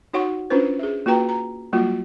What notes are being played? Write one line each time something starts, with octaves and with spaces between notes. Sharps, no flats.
D#4 F#4 C#5 F#5 C#6
C#4 D4 F4 B4 C5
G#4 E5
A#3 F4 F#4 B4 G5 A#5
A#5
F#3 G3 A#3 F4 F#4